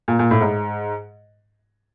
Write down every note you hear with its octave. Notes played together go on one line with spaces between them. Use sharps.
A#2
A#2
A2
G#2